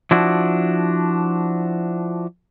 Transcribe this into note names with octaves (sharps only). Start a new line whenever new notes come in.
F3 D4 E4 F#4